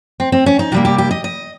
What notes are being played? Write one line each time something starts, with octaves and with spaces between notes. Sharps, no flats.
C4
C4
C#4
D#4
C3 G3 A#3 G4
G4
G4
D#5
D#5